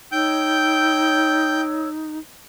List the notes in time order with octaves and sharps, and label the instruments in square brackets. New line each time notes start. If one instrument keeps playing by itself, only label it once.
[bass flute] D#4 [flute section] C#5 E6 [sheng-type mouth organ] G5 G6